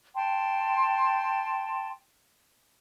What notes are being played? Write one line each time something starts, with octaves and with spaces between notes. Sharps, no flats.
G5 A5 C6